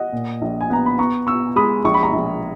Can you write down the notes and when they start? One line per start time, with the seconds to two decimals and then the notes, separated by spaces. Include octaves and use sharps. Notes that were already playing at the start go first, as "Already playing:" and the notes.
Already playing: D#5 F#5
0.12 A#2
0.42 A#1
0.61 G#5
0.70 B3 A#5
0.86 B5
0.98 B3 A#5 C#6
1.27 B3 C#6 E6
1.56 G#3 B5 D#6
1.85 A#1 C#6
1.94 B5
2.03 A#5 C#6
2.13 A#1